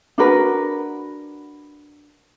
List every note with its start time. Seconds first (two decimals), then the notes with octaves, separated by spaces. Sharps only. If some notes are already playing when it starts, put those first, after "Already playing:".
0.18 D4 F#4 A#4 B4